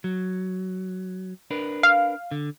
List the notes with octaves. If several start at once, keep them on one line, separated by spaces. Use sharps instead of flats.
F#3
D4 A#4 B4
F5
D3